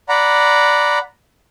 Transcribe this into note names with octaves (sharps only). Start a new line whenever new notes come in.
D5 F#5 A#5 B5